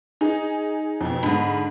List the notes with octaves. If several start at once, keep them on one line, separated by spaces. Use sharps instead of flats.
D#4 G#4
F2 B2
G#2 D3 B5